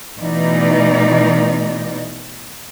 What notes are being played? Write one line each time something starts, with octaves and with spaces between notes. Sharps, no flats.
B2 E3 A3 D#4 D5